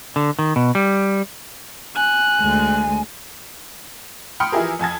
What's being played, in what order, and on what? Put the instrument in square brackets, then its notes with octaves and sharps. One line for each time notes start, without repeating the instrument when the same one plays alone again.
[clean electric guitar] D3
D#3
B2
G3
[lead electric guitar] G#5 [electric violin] F#6
[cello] D2 G#3
[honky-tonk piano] G5 B5 C6 D#6 F6 C#7
E3 F3 E4 G4 G#4 A#4
F2 G#5 A5 G#6